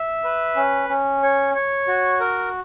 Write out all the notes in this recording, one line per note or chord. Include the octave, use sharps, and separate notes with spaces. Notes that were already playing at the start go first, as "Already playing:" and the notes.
Already playing: E5
B4
C#4
C#4
C#5
C#5
F#4
A#4